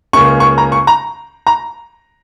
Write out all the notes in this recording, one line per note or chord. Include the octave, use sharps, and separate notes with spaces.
C#2 C#3 A#3 C#4 C#6
C#6
A#5
C#6
A#5
A#5